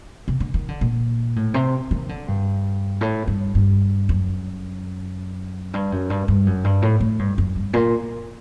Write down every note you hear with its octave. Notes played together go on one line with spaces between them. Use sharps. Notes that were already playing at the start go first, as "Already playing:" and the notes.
C3
D3
D#3
D3
A#2
A2
C3
D#3
D3
G2
A2
G2
G2
F#2
G2
F#2
G2
G2
F#2
G2
A2
A2
G2
F#2
G2
A#2